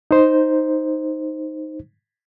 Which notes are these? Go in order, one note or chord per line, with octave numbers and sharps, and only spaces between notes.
D#4 C5